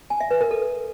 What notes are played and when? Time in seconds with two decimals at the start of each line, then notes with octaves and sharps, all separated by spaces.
0.10 G#5
0.20 E5
0.31 B4
0.41 A#4
0.51 A4